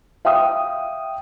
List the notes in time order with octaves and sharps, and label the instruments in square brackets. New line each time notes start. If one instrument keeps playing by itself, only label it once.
[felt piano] E5 F5 G5 D#6